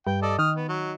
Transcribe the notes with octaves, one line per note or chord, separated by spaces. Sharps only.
G2 G5
A4 D5 D#5
D#3 D#6 F6
B3
F#3